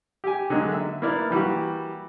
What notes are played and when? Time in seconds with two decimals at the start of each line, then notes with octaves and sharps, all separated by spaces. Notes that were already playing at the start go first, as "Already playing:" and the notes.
0.24 G4 G#5
0.50 D3 D#3 F#3 G#3 A#3
0.72 E5
1.02 A#3 B3 E4 D5 F6
1.30 E3 G3 A#3 F#4